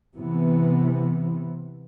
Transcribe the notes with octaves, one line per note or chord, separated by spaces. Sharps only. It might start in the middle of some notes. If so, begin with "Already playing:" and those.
C3 E3 B3